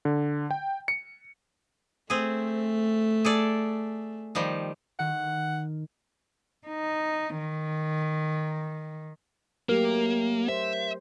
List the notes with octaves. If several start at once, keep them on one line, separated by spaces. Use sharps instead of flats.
D3
G5
C#7
A3 C4 G#4
G#4 A4 D5
D#3 F3 G3
D#3 F#5
D#4
D#3
F#3 A3 A#3 G4 A#4
C5 E5